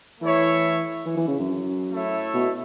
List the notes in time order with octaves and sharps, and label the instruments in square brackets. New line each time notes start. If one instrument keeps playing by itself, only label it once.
[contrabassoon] E3 [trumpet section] A3 E4 C#5 E5
[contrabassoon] E3
E3
C#3
F#2
[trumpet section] A3 E4 C#5 E5
[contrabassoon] B2